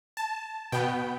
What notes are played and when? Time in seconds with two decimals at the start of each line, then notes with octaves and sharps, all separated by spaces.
0.17 A5
0.72 B2 B3 G5